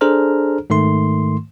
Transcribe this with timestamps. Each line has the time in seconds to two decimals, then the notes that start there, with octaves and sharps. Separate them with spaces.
0.01 D4 G#4 A4 C5 A#5 F6
0.70 G#2 D#3 A3 C6